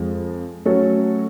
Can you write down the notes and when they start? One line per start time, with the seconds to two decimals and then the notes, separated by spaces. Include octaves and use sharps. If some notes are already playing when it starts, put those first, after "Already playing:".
Already playing: F2 F3 G#3
0.65 F#3 A3 C#4 F#4 A4